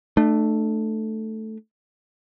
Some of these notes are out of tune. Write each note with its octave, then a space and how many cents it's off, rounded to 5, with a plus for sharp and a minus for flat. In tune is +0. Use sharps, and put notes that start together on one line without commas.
A3 +0 D4 +45